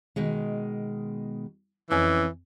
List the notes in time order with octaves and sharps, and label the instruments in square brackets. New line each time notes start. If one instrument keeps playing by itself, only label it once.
[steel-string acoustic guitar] B2 D#3 G#3
[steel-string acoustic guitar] F2 C#4 G#5 [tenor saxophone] E3